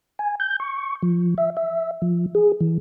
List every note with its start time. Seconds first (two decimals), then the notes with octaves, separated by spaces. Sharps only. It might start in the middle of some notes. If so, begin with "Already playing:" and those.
0.19 G#5
0.40 G6
0.60 C#6
1.02 F3
1.38 E5
1.57 E5
2.02 F3
2.35 G#4
2.60 E3